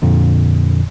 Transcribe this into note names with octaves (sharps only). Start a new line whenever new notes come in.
F2 A#2 D3